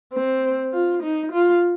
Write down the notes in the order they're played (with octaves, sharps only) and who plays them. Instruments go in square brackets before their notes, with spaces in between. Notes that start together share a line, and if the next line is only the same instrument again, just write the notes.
[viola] C4
F4
D#4
F4